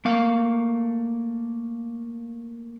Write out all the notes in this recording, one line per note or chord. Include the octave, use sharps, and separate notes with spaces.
A3 A#3 F5